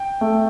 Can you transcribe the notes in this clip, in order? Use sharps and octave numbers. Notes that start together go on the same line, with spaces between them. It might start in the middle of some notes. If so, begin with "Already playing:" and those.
Already playing: G5
A3